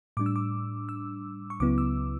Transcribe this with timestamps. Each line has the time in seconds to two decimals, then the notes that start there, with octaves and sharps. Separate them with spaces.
0.17 A2 G3 D4 D6
0.26 E6
0.36 D6
0.89 E6
1.50 C#6
1.60 C#2 C#3 F#3 B3 E4 D6
1.78 E6